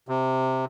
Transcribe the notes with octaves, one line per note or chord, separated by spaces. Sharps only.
C3